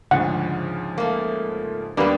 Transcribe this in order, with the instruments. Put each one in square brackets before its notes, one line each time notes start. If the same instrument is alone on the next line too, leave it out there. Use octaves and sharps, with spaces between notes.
[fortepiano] D2 [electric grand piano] G#2 C#3 F3 [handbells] F#5
[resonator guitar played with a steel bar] A3 A#3
[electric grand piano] D#2 [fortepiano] G3 A#3 B3 [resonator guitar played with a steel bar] D4 B4